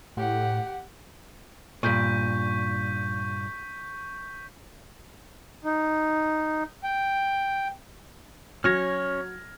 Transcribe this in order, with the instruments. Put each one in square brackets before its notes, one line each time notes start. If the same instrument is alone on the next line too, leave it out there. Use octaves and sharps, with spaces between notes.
[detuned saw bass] A2 [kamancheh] G4 F#5
[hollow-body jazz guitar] G2 A#2 [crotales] C#6 G6 B6
[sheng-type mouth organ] D#4
G5
[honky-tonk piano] F#3 [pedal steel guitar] C#4 C#5 [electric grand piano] F6 G#6 A#6